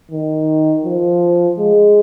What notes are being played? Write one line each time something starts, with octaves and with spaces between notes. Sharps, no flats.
D#3
F3
G#3